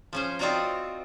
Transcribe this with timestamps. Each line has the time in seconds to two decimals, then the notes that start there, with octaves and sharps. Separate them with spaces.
0.13 F3 C#4 C5
0.39 C4 D#4 F4 F#4 D5 A#5